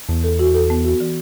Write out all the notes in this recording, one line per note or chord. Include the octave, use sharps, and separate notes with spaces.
E2 B3
A4
F#4
A4
B3
F#4
E3